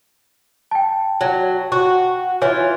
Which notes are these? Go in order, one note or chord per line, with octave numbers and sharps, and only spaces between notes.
G5 A5
F#3
F#4
E3 F4 C#5